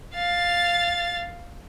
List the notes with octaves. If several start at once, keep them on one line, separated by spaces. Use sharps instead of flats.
F5 A6